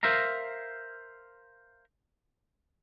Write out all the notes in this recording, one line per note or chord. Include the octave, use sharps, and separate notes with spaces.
A#4 C5 E5 F5 A#5